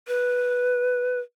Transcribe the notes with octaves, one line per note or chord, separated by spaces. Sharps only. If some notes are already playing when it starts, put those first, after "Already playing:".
B4